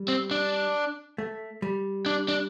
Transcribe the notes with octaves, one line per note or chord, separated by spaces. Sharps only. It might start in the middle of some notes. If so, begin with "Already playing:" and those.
Already playing: G3
C4
D4
A3
G3
D4
D4